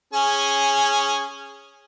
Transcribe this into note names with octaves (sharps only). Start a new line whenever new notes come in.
C#4 G#4